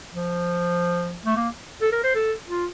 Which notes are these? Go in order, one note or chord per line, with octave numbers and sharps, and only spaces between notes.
F3
A3
A#3
A4
A#4
C5
A4
F4